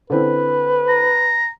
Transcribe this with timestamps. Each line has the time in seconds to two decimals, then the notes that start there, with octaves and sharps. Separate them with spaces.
0.10 D3 C4 E4 B4
0.89 A#5